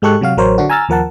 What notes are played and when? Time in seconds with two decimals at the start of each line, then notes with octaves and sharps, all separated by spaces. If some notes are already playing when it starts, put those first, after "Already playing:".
0.02 G#2 G#3 G4 A4 C#6 F#6
0.21 C3 F#3 F#4 F5
0.37 A1 F#3 A#4 C5 C#5
0.58 D3 D4 F#4
0.70 G#5 A#5 E6 F6 A6
0.89 D#2 F3 A#4 F#5 A5